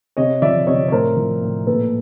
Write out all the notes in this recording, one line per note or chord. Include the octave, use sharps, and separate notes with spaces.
C3 C#5 D#5
F3 D5 E5
C3 C#5 D#5
C#5
A2 A#4 C5
F3
A2
A#2 A4 B4